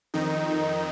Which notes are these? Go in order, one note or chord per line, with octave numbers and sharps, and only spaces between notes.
F2 D#3 D#4